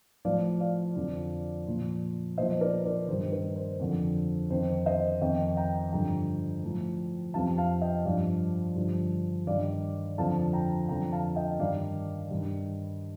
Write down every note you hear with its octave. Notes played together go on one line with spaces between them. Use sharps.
A2 F3 D5 F5
D5 F5
F2 D3 F3
A#2 F3
A#2 F3 C5 D#5
A#4 D5
A#4 D5
G2 D#3 C5
A#4
C5
F2 D3 F3
F2 D#3 C5
C5 D#5
F2 D#3 D#5 G5
G5 A#5
G2 D3 F3 G5 A#5
A2 F3
F2 C3 F3 F5 A5
F5 A5
D#5 G5
G2 F3 D5 F5
G2 D3 F3
G2 D#3 D5 F5
F2 D3 F3 F5 A5
G5 A#5
F2 D3 F3 G5 A#5
F5 A5
D#5 G5
G2 D#3 D5 F5
G2 D#3